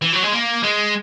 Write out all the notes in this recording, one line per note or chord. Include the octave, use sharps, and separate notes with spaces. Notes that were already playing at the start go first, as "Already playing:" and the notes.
E3
F#3
G#3
A#3
G#3